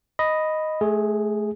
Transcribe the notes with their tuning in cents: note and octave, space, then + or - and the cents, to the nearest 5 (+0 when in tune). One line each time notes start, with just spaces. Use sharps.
D#5 +0 B5 +0
A3 -30 G#4 +0